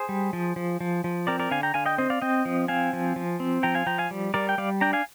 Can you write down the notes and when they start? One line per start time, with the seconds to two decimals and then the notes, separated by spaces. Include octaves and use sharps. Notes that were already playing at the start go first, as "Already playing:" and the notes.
Already playing: G#4 C5
0.09 G3
0.33 F3
0.56 F3
0.81 F3
1.04 F3
1.27 C4 A#4 D5
1.40 A#4 D5
1.51 D3 F5 G#5
1.63 G5 A#5
1.74 D3 F5 G#5
1.86 D#5 G5
1.98 C4 C5 D#5
2.10 D5 F5
2.22 C4 D#5 G5
2.45 F3
2.68 C4 F5 G#5
2.93 F3
3.16 F3
3.40 C4
3.63 F3 G5 A#5
3.75 F5 G#5
3.87 F3 G5 A#5
3.98 F5 G#5
4.11 G3
4.34 G3 A#4 D5
4.49 G5
4.58 G3 D5 F5
4.81 D4 G5 A#5
4.93 F5 G#5